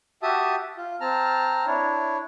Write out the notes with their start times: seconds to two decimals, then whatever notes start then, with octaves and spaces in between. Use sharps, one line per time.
0.23 F#4 G4 E5 A5 D#6
0.77 F4
1.01 C4 A5 A#5 F6
1.66 D4 E4 C#5